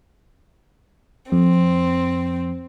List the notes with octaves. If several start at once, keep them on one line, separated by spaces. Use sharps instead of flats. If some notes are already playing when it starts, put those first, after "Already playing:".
F2 C4